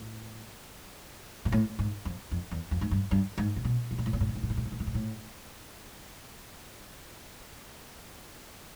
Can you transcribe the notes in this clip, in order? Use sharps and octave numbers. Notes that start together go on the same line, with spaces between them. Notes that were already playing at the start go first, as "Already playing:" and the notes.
Already playing: A2
A#2
A2
G#2
F2
F2
E2
F2
G#2
G2
G2
G#2
C3
B2
A2
A#2
A2
A#2
A2
A#2
A2
A#2
A2
A#2
A2
A#2
A2
A#2
A2